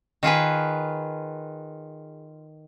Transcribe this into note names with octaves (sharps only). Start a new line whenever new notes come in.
D#3 F4 G#4 B4